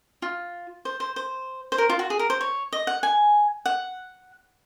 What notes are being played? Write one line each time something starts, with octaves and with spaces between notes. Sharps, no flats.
F4
C5
C5
C5
C5
A#4
F4
F#4
G#4
A#4
C5
C#5
D#5
F#5
G#5
F#5